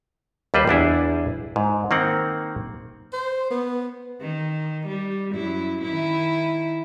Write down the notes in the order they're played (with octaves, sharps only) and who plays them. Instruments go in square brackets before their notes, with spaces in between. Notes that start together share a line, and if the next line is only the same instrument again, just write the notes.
[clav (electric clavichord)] D#2 G3 B4 C5
E2 D4 E4 G#4
G#2
D#3 A#3 C4 F#5
[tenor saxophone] C5
B3
[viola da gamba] D#3
G3
F#2 E4
D#3 E4